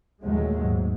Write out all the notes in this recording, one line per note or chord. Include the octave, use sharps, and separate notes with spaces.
D#2 A#2 F#3 G#3 A3
G#2